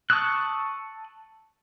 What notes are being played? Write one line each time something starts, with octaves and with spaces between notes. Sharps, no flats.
A5 C#6 D#6 E6 F#6